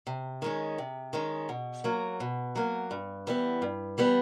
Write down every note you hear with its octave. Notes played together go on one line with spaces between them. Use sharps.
C3
D#3 G#3 C#4
C3
D#3 G#3 C#4
B2
F#3 A#3
B2
F#3 A#3
G2
E3 G3 B3
G2
E3 G3 B3